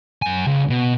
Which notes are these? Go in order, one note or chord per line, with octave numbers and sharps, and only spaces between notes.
F#2 G#5
C#2
B2